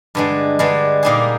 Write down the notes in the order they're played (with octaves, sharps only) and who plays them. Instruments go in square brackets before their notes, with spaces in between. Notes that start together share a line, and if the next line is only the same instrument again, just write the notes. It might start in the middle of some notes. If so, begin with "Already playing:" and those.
[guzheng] G2 D3 G#3
G2 D3 G#3
A#2 G3 A#3 D#4 G#4